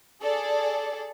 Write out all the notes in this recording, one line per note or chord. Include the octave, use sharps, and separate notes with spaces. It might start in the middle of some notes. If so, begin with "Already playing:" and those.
G#4 A4 D5